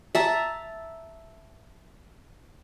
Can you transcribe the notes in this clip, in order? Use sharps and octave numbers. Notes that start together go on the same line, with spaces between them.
E5 A5 A#5